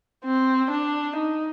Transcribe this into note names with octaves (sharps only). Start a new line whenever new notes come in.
C4
D4
D#4